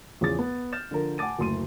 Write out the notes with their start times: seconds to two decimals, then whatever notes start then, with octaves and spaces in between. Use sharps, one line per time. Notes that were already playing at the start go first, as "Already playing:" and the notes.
0.21 E2 C#3 F3 G#4 D6 A6
0.39 B3
0.73 F6 G6 A6 E7
0.91 D3 F3 A#4
1.18 F#5 G#5 A5 D6 A6 D#7
1.39 F#1 D2 C6 D#7